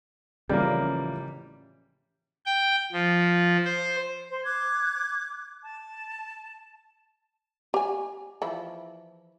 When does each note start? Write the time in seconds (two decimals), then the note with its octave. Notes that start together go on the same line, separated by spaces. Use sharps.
0.49 A1 C#3 E3 F3 G3 A#3
2.46 G5
2.93 F3
3.65 C5
4.30 C5
4.45 D6 F#6 G#6
5.62 A5
7.74 G4 G#5
8.42 E3 F3 E4